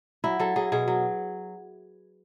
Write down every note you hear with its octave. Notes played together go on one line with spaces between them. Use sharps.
F#3 E4
F#3 A4
F#3 G#4
B2 G#4
F#3